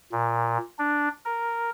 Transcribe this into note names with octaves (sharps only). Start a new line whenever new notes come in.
A#2
D4
A#4